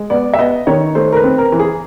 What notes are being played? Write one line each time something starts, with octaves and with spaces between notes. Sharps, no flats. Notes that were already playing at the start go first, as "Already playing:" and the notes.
Already playing: G#3
B3 D5
E5
B3 D#5
D#3 C#5
A3 C5
A#4
B4
C4
A#4
E3
G#4